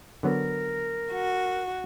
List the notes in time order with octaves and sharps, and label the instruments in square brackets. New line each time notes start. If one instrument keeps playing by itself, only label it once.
[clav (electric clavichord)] D3 F#3 B3 [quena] A#4
[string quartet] F#4